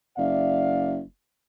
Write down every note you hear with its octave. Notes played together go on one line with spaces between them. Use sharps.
F#1 D5 E5 F5